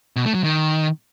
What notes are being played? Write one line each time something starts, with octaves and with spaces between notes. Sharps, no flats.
B2
A3
F#3
D#3